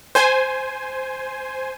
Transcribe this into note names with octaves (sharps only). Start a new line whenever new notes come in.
C5 G#5